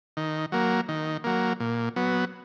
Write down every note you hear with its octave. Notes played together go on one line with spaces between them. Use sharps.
D#3
F#3 A#3
D#3
F#3 A#3
A#2
F#3 B3